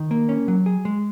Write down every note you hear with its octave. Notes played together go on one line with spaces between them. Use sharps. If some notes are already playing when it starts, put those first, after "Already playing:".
Already playing: D#3
A#3
C#4
F#3
G#4
G#3